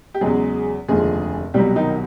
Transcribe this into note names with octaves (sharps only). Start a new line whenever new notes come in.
G4
E2 C#3 F#3 G#3 G#4
F1 D#2 D3 F3 G#3 G#4
C2 B2 F#3 G3 G4
D#3 D#4